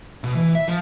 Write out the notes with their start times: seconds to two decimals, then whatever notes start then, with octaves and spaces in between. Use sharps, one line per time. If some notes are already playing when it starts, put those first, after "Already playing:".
0.24 B2
0.35 E3
0.55 E5
0.68 F3